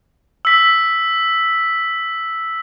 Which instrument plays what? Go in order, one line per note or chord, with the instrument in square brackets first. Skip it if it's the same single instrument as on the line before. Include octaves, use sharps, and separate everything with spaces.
[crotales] E6 B6